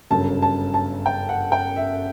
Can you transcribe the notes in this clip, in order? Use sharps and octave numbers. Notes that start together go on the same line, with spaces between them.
G1 F#2 C#3 A5
A5
A5
G5
F#5
G5
E5